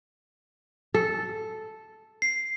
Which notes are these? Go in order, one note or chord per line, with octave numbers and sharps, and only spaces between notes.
A4
C7